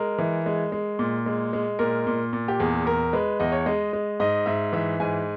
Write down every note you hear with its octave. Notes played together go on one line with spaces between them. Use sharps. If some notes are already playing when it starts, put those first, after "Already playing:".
Already playing: G#3 A#4
E3
G#3
G#3
A#2
G#3
G#3
A#2 A#4
A#2
A#2
G4
E2 G#4
E2 A#4
G#3 B4
E2 D#5
C#5
G#3 D#5
G#3
G#2 D#5
G#2 E5
E3 E5
G#2 G#5